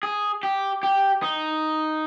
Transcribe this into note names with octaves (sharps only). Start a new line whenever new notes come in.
G#4
G4
G4
D#4